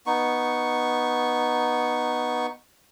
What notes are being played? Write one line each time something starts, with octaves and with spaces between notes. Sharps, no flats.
B3 D#4 C#6